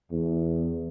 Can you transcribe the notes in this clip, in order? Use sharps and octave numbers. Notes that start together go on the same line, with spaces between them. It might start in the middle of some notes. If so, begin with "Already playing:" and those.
E2